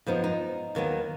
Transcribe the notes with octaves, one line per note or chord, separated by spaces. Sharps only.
F#2 F3 B3 D#4
D#4
D#2 D#3 F#3 B3